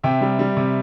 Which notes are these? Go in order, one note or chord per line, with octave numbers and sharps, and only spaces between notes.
C3 E5 G5
G3
G3
C3